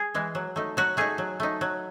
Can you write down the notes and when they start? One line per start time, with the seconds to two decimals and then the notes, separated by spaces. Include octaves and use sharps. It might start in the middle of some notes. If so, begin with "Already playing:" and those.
Already playing: G#4
0.14 E3 G#3
0.35 F#3
0.56 A3 D#4
0.77 F#3 F#4
0.97 A3 D#4 G#4
1.18 F#3
1.40 A3 D#4
1.61 F#3